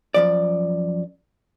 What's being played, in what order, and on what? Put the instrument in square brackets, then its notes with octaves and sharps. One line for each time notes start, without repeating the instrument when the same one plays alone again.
[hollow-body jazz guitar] F#2 F3 D5